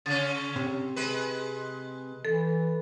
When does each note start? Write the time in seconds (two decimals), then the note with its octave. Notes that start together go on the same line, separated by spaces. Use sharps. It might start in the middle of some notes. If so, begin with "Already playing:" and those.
0.06 C#3 C#4 A6
0.56 C3
0.96 G#3 B4
2.25 E3 A4